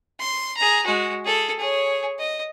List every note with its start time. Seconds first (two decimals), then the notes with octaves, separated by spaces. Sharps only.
0.20 C6
0.57 G#4 A#5
0.86 G#3 F#4
1.25 G#4 A4
1.59 G#4 C#5
2.19 D#5